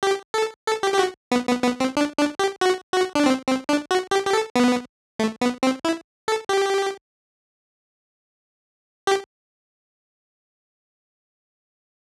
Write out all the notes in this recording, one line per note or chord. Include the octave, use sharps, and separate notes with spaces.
G4
A4
A4
G4
G4
F#4
B3
B3
B3
C4
D4
D4
G4
F#4
F#4
D4
C4
C4
D4
F#4
G4
G4
A4
B3
A3
B3
C4
E4
A4
G4
G4